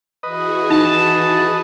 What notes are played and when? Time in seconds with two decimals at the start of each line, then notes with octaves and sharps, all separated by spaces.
0.23 E3 F#4 G#4 B4 D#5
0.70 D#4 A5